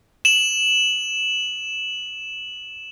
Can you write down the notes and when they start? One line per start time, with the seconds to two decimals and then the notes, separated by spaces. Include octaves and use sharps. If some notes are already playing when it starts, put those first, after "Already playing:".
0.25 E7 F#7